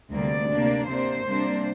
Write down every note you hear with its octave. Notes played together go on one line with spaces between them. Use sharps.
D2 C3 G3 A#3 D5
C3 A#3 D4
C3 A#3 D4 C5
C3 G3 A#3 D4